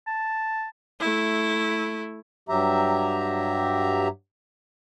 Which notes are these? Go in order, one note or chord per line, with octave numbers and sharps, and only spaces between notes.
A5
A3 E4
G2 F#3 G4 E5 A#5